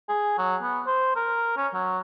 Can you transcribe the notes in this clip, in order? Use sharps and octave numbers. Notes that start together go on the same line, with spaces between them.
G#4
F#3
B3
C5
A#4
C#4
F#3